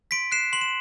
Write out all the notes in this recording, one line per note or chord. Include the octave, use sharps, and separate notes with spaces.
C6 B6 D7
F#6 C7 E7
C6 F#7
E7